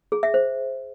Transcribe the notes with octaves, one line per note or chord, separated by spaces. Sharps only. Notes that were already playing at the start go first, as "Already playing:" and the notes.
G#4
E5
C5